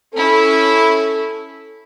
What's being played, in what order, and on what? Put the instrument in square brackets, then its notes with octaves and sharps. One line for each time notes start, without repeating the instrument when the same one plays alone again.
[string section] C#4 E4 [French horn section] A4